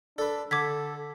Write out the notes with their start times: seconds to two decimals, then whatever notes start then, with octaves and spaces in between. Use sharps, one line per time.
0.18 D4 A4 B4 D5
0.51 D3 A4 D6 G#6 B6